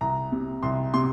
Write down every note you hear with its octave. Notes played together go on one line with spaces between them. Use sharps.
C2 A#5
C3
C2 C6
C3 C6